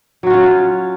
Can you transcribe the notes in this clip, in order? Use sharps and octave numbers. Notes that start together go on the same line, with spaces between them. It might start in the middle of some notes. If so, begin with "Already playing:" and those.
F#3 C#4 F4 F#4